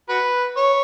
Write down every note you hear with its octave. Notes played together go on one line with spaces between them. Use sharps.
F#4 B4
C#5